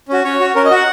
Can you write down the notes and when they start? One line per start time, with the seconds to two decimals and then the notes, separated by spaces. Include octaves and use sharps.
0.09 C#4 F#4
0.24 C#4 C#5
0.40 F#4
0.55 C#4 A#4
0.65 D#5
0.70 F#4 F#5